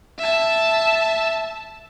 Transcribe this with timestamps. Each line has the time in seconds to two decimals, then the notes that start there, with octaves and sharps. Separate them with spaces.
0.19 E5 A5